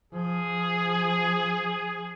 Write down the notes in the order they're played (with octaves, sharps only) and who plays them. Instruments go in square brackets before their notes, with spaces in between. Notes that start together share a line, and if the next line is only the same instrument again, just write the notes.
[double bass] F3 [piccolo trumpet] G#4